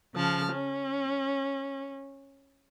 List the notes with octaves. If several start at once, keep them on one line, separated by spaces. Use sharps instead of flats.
C#3 F3 A5 F6
C#4